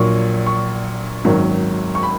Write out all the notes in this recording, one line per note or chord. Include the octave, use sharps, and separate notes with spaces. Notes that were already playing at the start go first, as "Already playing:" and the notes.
Already playing: A#1 A#2 F#3 C#6
C#6
G#1 F#2 D#3 F#3
C#6
B5